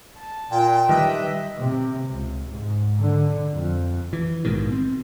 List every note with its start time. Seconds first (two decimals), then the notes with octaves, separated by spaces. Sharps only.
0.18 A5
0.51 A#2 G5
0.89 D#3 G3 G4 B4 D#5 E5
1.58 C3
2.10 C#2
2.47 G#2
3.00 D3
3.53 F2
4.13 E3
4.45 A#1 G#2 B2 D#3
4.72 C4